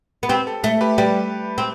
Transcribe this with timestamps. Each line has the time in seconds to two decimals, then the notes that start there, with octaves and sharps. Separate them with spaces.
0.23 B3
0.29 C4 G4 B4
0.47 A4
0.63 A3 A4
0.81 G4 B4
0.98 G3 G4 B4
1.58 C4